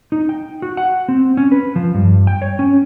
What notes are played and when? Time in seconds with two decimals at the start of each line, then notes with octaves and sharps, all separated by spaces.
0.12 D#4
0.29 G5
0.62 F#4
0.77 F#5
1.09 C4
1.37 C#4
1.52 B4
1.76 F3
1.95 G2
2.27 G5
2.42 C#5
2.59 C#4